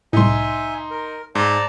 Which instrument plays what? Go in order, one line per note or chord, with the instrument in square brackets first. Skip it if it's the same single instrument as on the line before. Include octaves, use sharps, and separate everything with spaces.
[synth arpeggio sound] C2 A2 [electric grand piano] D#4 C6 [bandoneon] E5 G#5
[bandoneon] A#4
[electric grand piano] G#2 [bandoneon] D5 A5 A#5